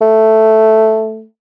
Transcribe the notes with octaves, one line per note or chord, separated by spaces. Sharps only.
A3